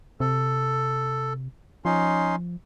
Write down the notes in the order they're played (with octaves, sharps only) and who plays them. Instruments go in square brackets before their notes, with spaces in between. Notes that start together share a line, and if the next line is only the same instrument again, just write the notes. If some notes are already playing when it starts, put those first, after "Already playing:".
[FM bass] C3 [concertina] A4
[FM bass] F3 [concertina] C#4 D#4 C6